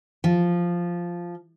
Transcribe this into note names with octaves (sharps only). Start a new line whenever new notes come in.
F3